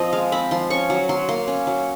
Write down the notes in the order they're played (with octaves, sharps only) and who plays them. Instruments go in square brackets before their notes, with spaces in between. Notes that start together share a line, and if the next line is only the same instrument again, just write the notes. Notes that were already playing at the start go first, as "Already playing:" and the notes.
Already playing: [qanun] F3 C4 D#5
G#3 F5
C4 B5
F3 C6
C#4 C#6
F#3
F#3 C6
A#3 C6
C#4
F#3